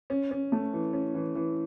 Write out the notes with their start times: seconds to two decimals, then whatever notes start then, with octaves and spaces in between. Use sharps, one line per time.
0.10 C#4
0.31 C#4
0.52 A3
0.73 E3
0.93 C#4
1.15 E3
1.35 E3